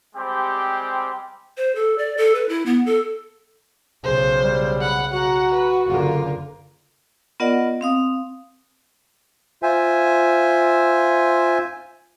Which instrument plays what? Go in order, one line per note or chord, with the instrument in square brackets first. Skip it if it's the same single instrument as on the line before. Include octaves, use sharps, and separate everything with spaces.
[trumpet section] G3 G#3 C4 G4 C5 G5
[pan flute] C5
A4
D5
A4
B4
E4
B3
A4
[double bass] B1 C#3 [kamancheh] C5
[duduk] G3
[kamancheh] F#5 B5
[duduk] F#4 [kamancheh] F#5 A#5
[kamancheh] B4
[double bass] F#1 D3 [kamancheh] F4 A#4
[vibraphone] B3 F4 A#4 D5 D#5 F#5
C4 F5 D#6
[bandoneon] F4 C5 E5 G#5